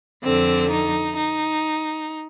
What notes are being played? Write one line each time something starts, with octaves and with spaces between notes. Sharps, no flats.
F2 D3 C4
D#4
D#4